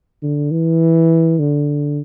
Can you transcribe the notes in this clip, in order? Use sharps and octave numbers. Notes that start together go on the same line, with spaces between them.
D3
E3
D3